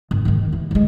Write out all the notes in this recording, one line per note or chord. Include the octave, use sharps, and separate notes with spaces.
G#1
G#2 D#3
E3
F#3 G#3